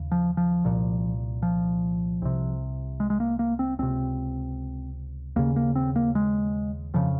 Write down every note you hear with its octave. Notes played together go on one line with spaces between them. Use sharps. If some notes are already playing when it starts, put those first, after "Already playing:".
Already playing: D#2 C#3
F3
F3
C2 A#2
F3
C2 C3
G#3
G#3
A#3
A#3
C4
C#2 C3 C4
D#2 C#3 A#3
A#3
C4
A#3
G#3
F2 C#3 F3